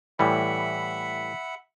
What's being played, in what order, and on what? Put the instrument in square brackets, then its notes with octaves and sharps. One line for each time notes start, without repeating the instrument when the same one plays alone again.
[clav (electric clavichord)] A2 E3 G3 [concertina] E5 F#5 B5